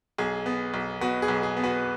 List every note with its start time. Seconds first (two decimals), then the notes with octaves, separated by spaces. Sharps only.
0.18 B1 G#4
0.46 B3
0.74 B1
1.01 B2 F#4 B4
1.22 G#4
1.28 B1
1.43 G#4
1.57 B3
1.63 F#4 B4